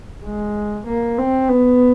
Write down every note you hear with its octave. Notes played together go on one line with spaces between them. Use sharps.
G#3
A#3
C4
B3